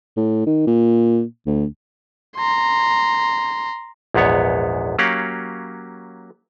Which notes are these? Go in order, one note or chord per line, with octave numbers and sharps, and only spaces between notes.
A2
D#3
A#2
D2
A#5 C6
A#1 E2 G#2 B3 C#5
F#3 A#3 C#4 G4 F5 F#5